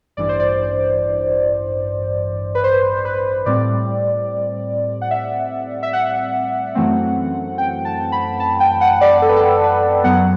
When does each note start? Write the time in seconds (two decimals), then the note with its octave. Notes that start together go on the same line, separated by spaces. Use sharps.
0.17 A1 G2 E3 D5
0.29 C5
0.40 D5
2.55 B4
2.64 C5
3.05 B4
3.46 A2 G3 C4 D5
5.01 F#5
5.11 E5
5.83 E5
5.93 F#5
6.75 F#2 E3 A3 C4
7.58 G5
7.85 A5
8.12 B5
8.40 A5
8.60 G5
8.81 F#5
9.01 D5
9.22 A4
9.29 B4
9.36 A4
9.63 B4
10.04 F#2 F#3 B3 F#5